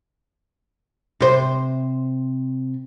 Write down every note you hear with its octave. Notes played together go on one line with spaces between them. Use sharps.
C3 C5